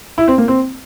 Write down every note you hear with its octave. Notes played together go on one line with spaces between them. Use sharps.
E4
C4
A#3
C4